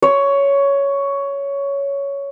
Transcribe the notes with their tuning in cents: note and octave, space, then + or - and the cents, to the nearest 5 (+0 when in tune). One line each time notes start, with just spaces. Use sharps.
C#5 +10